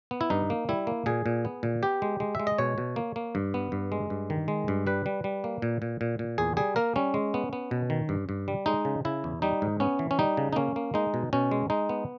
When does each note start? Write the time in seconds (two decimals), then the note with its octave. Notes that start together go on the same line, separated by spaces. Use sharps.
0.11 B3
0.21 E4
0.30 G2 D#4
0.50 A#3
0.69 G3 E4
0.87 A#3
1.06 A#2 G#4
1.26 A#2
1.45 B3
1.63 A#2
1.83 B3 G4
2.02 G#3
2.20 G#3
2.35 G#3 E5
2.47 D#5
2.58 B2 C#5
2.78 B2
2.96 A#3
3.16 A#3
3.35 G2
3.54 B3
3.72 G2
3.92 G#3
4.10 G2
4.30 D#3
4.48 G#3
4.68 G2
4.87 G3 B4
5.06 G3
5.24 G3
5.44 A#3
5.62 A#2
5.82 A#2
6.01 A#2
6.19 A#2
6.38 E2 G#4
6.57 G3 G#4
6.76 A#3 A#4
6.96 G3 C#4
7.14 G#3
7.34 B3
7.53 B3
7.71 B2
7.90 D#3
8.09 G2
8.29 G2
8.48 G3
8.66 G#3 D#4
8.85 C#3
9.05 C#3 E4
9.24 E2
9.42 G3 D#4
9.62 G#2
9.80 B3 C#4
9.99 E3
10.11 C#4
10.19 G3 D#4
10.37 C#3
10.53 D#4
10.56 A#3 C#4
10.76 A#3
10.94 G#3 D#4
11.14 B2
11.33 B2 C#4
11.51 G#3
11.70 G#3 D#4
11.89 B3